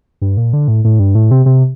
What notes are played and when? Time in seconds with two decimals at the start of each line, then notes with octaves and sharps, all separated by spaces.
0.21 G2
0.37 A#2
0.53 D3
0.68 A2
0.85 A2
0.99 G2
1.15 A2
1.31 C3
1.46 C3